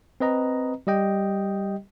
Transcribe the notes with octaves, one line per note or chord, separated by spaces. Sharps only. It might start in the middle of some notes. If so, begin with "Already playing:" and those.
C4 B4 D#5 A#5
G3 G4 D#5 G5